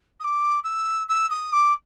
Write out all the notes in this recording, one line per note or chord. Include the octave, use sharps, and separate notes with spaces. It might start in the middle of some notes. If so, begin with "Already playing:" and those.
D#6
D6
E6
E6
D#6
D6